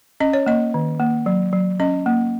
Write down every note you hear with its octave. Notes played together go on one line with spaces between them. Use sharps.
C#4 D#5
C#5
A#3 D#5
D#3
A#3
F#3
F#3
C#4 D#5
A#3